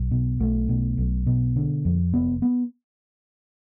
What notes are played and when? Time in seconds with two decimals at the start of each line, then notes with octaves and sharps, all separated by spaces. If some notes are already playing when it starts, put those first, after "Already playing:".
Already playing: B1
0.11 B2
0.40 B1 A3
0.69 B2
0.98 B1
1.27 B2
1.56 D3
1.85 F2
2.13 F1 B3
2.42 B3